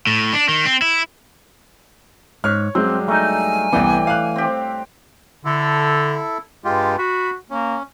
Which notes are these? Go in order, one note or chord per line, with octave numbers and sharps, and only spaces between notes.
A2
D4
D#3
C4
E4
G#2 C#5 F6
G2 F#3 G#3 C4
A3 D#4 A#4 G#5
C2 A2 E3 B3 D5 G5
F5 F#6
C4 G4
D3 E4 A4
G2 G#3 F4 G4
F#4 B5
A#3 C#4